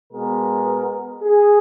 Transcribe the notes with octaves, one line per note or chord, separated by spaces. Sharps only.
B2 G#3 B3 A#4
G#4